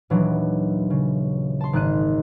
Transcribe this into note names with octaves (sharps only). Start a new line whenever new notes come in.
D#1 E3 F#3 D4
C#3
A5 C6
G#1 D#3 F#6 D#7